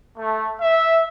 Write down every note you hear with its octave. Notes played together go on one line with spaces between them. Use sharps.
A3
E5